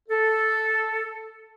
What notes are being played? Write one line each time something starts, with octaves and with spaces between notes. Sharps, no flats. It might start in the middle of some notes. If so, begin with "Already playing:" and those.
A4